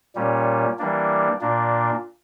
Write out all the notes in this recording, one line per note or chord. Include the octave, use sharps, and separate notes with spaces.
A#2 G3 A#3 C#4
E3 G3 A#3 D4
A#2 A#3 D4